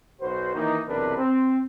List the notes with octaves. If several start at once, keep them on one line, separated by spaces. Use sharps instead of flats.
B1 F#4 B4 C5
D#3 E3 A#3 D#4
B1 E2 C3 D4 A#4 B4
C4